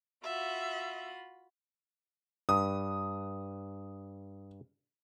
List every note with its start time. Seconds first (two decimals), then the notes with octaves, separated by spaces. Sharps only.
0.23 F4 F#4 E5 B5
2.49 G2 D#6